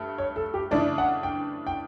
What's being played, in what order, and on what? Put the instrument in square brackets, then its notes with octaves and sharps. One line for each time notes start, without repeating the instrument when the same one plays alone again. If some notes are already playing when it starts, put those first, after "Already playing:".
Already playing: [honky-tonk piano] G2 A3
[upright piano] C#5
A4
G4
[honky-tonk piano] C#3 E3 A3 D4 [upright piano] D5
[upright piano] F#5
G5
G5